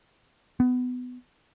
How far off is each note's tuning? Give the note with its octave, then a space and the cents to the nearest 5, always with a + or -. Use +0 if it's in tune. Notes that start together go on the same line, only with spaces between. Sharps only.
B3 +20